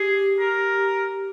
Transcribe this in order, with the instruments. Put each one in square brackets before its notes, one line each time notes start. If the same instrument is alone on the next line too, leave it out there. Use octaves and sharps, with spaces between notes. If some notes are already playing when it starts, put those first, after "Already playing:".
Already playing: [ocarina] G4 [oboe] G#4
[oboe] A#4